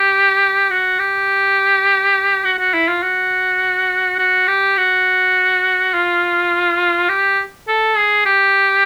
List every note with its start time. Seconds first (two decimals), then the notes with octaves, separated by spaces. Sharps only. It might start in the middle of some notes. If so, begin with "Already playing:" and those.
Already playing: G4
0.70 F#4
0.99 G4
2.45 F#4
2.59 F#4
2.73 E4
2.88 F4
3.03 F#4
4.19 F#4
4.48 G4
4.77 F#4
5.94 F4
7.09 G4
7.68 A4
7.97 G#4
8.26 G4